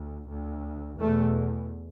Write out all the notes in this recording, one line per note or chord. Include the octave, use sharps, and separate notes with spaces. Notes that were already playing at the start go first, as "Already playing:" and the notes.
Already playing: D2
D2
E2 B2 A3